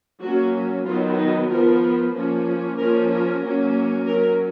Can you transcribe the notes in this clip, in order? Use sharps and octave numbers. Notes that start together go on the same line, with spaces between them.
F#3 A#3 C#4 F#4
D#3 F#3 B3 F4
D#4
F3 B3 A#4
F3 A#3 C#4
F3 A#3 C#4 A#4
A#4
F#3 A#3 C#4
F#3 C#4 A#4